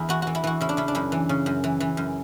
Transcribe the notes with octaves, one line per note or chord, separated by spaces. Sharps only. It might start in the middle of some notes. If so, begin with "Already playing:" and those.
Already playing: E2 E4
E3 F#4
E3 F#4
E4
E3 F#4
C#3 E4
D4
C#3 E4
D4
F#2 E4
E3
C#3
F#2
E3
E3
F#2